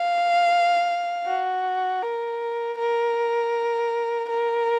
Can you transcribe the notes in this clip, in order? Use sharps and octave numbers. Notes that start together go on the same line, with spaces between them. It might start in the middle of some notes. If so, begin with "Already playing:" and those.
Already playing: F5
F#4
A#4
A#4
A#4